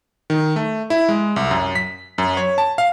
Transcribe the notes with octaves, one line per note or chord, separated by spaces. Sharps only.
D#3
A3
E4
G#3
C2
F#2
B6
F#2
C#5
A5
F5